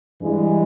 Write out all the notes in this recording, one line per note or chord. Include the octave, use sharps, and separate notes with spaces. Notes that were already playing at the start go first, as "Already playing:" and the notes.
G2 E3 G#3